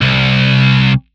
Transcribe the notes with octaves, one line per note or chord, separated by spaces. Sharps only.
C2